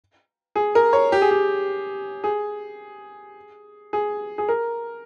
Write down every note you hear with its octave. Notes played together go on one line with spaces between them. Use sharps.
G#4
A#4
C#5
G4
G#4
G4
G#4
G#4
G#4
A#4